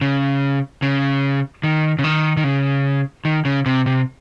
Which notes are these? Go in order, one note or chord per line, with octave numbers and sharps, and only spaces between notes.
C#3
C#3
D#3
C#3
D#3
D#3
C#3
D#3
C#3
C3
C3